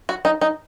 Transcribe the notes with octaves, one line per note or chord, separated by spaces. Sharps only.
F#4
D#4
D#4